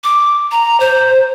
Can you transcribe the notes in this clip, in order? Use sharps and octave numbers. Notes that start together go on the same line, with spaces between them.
D6
A#5
C5